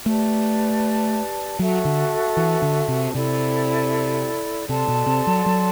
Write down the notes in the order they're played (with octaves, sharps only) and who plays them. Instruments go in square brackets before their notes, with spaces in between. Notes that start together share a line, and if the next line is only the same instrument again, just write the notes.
[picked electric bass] A3 [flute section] G4 B4 D5 A5
[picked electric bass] F#3 [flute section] F#4 A4 E5 A5
[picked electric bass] D3
E3
D3
C3
[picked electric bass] C3 [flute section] E4 A4 D5
[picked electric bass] C3 [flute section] A4 D5 A5 C6
[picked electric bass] B2
C3
F#3
F#3